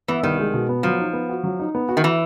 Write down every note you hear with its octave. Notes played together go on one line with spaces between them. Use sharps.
E3 B3
C2 D#3
G#3
B2
B3
F3 F#3
D#4
B3
F#4
F#3
D#4
B3
F#4
D#3
E3